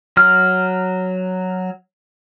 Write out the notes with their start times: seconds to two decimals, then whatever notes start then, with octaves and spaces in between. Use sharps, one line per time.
0.17 F#3 F6